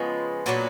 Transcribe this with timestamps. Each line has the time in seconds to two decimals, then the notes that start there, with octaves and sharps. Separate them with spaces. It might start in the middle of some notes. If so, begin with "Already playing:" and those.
Already playing: C#3 F3 G#3 B3
0.46 A#2 F#3 B3 D4